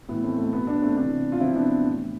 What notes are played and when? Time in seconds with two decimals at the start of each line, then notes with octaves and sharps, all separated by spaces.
0.09 A2 E3 B3
0.24 A3 C4
0.38 A3
0.53 B2 B3
0.67 B3 D4
0.82 A3 C4
0.96 C3 E3 B3 D4
1.32 F4
1.41 C3 F3 C4 E4
1.55 B3 D4
1.84 A2 E3